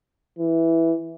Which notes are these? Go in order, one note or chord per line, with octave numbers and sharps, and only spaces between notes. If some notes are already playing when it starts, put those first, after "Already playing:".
E3